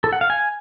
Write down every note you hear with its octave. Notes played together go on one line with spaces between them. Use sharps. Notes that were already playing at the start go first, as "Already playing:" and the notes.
A4
F#5
F5
G#5